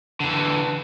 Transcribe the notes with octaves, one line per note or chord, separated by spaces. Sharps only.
D3 E3